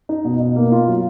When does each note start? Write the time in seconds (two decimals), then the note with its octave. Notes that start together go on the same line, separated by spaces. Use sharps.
0.09 D#4
0.25 B2
0.40 B2
0.56 A#3
0.72 F4
0.87 F#3